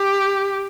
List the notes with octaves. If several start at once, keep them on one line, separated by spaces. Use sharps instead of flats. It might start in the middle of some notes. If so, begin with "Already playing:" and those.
Already playing: G4